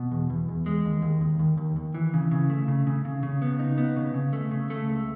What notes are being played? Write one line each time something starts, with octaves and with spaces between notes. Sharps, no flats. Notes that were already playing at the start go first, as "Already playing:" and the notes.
Already playing: B2
E2
E2
E2
G#3
D#2
D#2
D#2
D#2
D#2
D#2
E3
C#3
C#3
A3
C#3
C#3
C#3
C#3
B3
D#4
B3
C#3
C#3
A3
C#3
A3
C#2